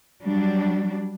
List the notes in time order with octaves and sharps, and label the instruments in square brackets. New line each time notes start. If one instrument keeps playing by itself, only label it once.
[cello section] F#3 G3 D4